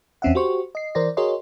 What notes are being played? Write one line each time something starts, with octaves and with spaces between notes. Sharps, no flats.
E2 C4 C#4 E5 F#5
F#4 G4 C5 C#6
D#5 C7
E3 A#4 C5 D5 A#6
F#4 G#4 A#4 C#5 D#5 C6